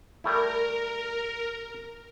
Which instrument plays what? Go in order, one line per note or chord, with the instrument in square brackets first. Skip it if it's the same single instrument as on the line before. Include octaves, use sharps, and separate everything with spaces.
[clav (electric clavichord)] G3 A3 E4 [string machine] A#4